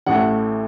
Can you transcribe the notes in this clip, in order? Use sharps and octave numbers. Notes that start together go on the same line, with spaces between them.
A1 A2 A3 F#5